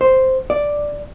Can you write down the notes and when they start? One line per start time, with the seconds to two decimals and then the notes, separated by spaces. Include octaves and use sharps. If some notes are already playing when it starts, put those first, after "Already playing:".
0.01 C5
0.50 D5